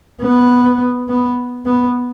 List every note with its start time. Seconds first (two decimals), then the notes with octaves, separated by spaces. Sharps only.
0.21 B3
1.08 B3
1.66 B3